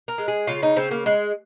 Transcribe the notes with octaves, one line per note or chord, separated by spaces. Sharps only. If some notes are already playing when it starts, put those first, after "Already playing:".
A#4
G#3
G#4
C#3 F4
D#4
C#3 C4
A#3
G#3